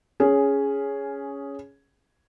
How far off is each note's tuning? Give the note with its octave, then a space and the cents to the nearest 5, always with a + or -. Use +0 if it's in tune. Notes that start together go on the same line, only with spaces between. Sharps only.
C#4 +10 G#4 +0